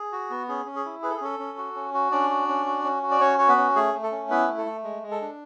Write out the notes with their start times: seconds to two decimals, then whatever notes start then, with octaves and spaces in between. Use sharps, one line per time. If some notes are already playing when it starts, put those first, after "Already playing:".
Already playing: G#4
0.12 F#4
0.30 B3
0.48 C#4 G#4
0.66 C#4
0.76 G#4
0.85 E4
1.02 G#4 B4
1.10 A4
1.17 G#4
1.21 C#4 A4
1.39 C#4
1.58 F#4
1.75 C#4
1.94 F#4
2.12 C#4 D4 D5
2.30 F#4
2.48 C#4
2.66 F#4
2.84 C#4
3.03 F#4
3.11 D5
3.21 C#4 C#5
3.38 F#4 C#5
3.48 B3 B4
3.57 C#4
3.75 A3 G#4
3.94 A3
4.03 A4
4.12 C#4
4.30 B3 E4 B4
4.48 A3
4.58 A4
4.66 A3
4.84 G#3
5.03 G#3
5.11 A4
5.21 D4